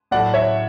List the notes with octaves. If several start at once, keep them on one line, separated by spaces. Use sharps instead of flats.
A2 F#3 A3 D5 F#5
C#5 E5